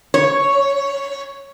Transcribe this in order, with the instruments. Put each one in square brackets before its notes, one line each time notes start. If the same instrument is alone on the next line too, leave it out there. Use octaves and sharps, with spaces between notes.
[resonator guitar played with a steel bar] C#5